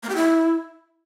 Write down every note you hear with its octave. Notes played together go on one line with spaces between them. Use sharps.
A#3
G4
E4